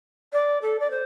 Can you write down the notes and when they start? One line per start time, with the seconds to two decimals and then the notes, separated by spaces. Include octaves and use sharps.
0.32 D5
0.61 A4
0.79 D5
0.90 C5